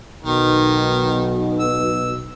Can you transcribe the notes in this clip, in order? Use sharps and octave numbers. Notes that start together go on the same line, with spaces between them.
B1 B2 D#3
E6